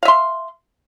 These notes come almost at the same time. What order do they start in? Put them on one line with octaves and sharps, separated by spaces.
F5 E5 C6